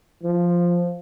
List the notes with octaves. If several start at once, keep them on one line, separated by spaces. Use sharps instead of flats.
F3